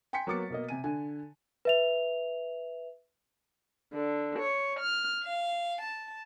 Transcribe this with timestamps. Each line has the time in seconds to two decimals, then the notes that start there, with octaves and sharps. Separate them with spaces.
0.13 G5 G#5 C6 B6 C#7
0.27 F#3 A#3 B3 D6 A6 C#7
0.50 B2 A#3 D#5
0.69 C3 G#5 D#7
0.84 D3 G#5
1.65 B4 E5 F7
3.93 D3
4.39 C#5
4.79 F6
5.25 F5
5.81 A5